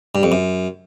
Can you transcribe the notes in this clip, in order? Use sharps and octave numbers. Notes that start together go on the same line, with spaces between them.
G2
F2
F#2